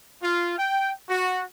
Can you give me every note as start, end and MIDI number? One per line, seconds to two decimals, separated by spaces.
0.22 0.57 65
0.57 0.92 79
1.09 1.44 66